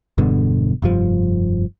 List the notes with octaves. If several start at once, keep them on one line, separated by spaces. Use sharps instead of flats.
E1 G2 B2 D3
F1 G2 F3